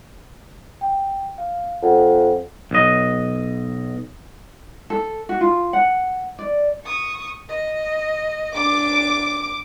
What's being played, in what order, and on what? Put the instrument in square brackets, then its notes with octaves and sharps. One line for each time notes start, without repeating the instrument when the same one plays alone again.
[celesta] G5
F5
[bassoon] F2 [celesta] F#5
[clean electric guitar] B1 D#5
[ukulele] A4
F#4
F4
F#5
D5
[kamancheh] C#6 D#6
D#5
[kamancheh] D4 [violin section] D6